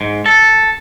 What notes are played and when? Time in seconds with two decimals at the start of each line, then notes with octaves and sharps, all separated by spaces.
0.01 G#2
0.26 A4